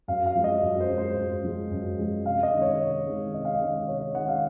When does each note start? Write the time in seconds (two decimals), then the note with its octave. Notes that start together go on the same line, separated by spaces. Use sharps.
0.08 F#2 F5
0.26 F5
0.35 F3 G#3
0.44 D#5
0.62 F#2
0.80 C5
0.89 F3 G#3
0.98 C5
1.17 F#2
1.44 F3 G#3
1.71 F#2
1.98 F3 G#3
2.25 C3 F5
2.43 D#5
2.52 D#3 G#3
2.62 C#5
2.79 C3
3.07 D#3 G#3
3.34 C3 D#5
3.45 F5
3.55 D#5
3.61 D#3 G#3
3.88 C3 C#5
4.01 D#5
4.15 D#3 G#3 F#5
4.28 F5